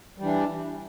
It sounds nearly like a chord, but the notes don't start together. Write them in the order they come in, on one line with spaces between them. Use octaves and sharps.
G3 E3 D4